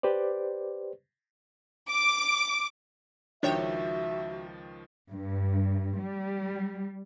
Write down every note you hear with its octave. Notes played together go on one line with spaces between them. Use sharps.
G4 B4 C5 D5
D6
C#2 D#3 F3 D4 F#4 C#5 E5 G5
G2
G3